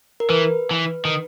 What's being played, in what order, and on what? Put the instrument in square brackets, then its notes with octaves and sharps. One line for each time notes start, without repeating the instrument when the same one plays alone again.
[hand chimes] A#4
[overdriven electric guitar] E3 [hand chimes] B4
[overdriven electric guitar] E3
D#3